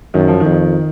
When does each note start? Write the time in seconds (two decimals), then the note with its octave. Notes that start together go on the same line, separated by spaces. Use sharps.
0.14 F#2 D#3
0.28 F3
0.40 F2 D#3